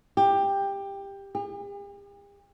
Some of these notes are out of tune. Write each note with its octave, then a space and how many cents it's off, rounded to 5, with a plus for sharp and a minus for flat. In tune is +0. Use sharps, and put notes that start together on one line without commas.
G4 +15
G4 +45